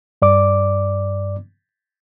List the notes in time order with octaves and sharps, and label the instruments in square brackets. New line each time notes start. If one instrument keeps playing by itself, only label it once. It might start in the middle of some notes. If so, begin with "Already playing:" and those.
[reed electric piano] G2 D5 D6